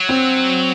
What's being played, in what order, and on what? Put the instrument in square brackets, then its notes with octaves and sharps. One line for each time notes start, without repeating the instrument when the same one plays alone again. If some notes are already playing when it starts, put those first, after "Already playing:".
Already playing: [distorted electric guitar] F#3
[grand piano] C4